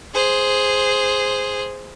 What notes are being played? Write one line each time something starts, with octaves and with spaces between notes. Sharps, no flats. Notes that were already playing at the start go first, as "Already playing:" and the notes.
G#4 C5